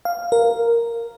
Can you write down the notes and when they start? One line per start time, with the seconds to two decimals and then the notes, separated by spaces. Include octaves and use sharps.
0.05 F5
0.32 A#4